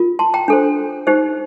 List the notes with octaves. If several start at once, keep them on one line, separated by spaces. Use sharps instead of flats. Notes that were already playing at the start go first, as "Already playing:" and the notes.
Already playing: F4 A#4
A5 C6
G5 A#5
D4 A4 C5
D#4 G4 C5